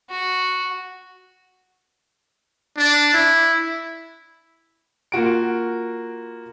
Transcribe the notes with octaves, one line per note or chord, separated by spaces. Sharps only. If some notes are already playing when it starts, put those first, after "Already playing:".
F#4
D4
E4
A#3 F4 F#4 D7